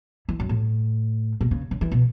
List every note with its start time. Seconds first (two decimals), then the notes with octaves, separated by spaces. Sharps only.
0.29 E3
0.40 F#2
0.49 A2
1.41 B2
1.51 C#3
1.71 C#3
1.81 E3
1.91 B2